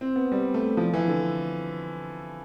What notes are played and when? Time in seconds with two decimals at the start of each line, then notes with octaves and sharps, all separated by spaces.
0.01 C4
0.16 B3
0.32 G3
0.54 A3
0.77 F3
0.93 E3
1.08 D3